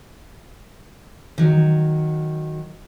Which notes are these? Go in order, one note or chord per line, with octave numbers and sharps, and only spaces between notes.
D#3 F#3